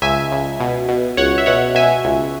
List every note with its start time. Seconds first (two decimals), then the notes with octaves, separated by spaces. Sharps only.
0.02 C#2 E5 G#5
0.31 C#2
0.60 B2
0.89 B2
1.17 C#2 C#5 F#5
1.38 E5
1.46 B2 C#5 F#5
1.75 B2 E5 G#5
2.05 C#2